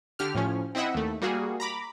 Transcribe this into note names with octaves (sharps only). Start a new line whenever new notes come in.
D3 G4 F6
A2 F3 C#4
C4 E4 D#5 E5 F#5
D#2 A3
G3 A#3 F#4 G#4
A#5 B5 D6